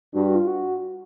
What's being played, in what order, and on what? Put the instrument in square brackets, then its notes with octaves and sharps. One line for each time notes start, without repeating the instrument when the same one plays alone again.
[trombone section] G2 [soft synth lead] F#4
[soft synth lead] F#4
F4
F#4